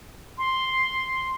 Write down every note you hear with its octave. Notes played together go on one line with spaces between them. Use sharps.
C6